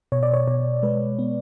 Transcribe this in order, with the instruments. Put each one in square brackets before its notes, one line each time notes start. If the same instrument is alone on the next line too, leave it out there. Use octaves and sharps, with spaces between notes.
[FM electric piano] B2 C#5
D5
C#5
B2 C#5
G#3 B4
B3